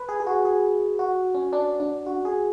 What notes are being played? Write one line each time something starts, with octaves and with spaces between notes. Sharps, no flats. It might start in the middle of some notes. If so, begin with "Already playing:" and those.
Already playing: B4
G#4
G#4
F#4
G#4
F#4
C#4
D4
D4
F#4
G#4